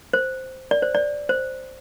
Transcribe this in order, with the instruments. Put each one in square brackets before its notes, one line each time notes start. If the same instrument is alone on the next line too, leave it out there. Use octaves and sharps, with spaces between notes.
[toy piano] C5
D5
C5
D5
C5